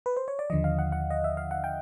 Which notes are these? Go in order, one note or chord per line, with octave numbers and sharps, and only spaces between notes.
B4
C5
C#5
D5
D#2 D3 F3 D#5
F5
F#5
F#5
D#5
E5
F5
F#5
G5